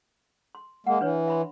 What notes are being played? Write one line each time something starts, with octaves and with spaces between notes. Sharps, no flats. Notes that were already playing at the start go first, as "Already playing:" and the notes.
C6
G#3 A#3 F#5
E3 D4 B4 C#5
E5 B5 C6